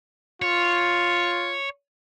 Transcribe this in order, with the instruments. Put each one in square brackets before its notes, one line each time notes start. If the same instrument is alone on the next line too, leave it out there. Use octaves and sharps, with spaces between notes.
[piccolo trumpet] F4 [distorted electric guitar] C#5